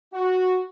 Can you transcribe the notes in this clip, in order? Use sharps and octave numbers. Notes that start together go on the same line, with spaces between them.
F#4